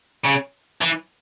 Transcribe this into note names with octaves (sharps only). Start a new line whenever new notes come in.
C#3
E3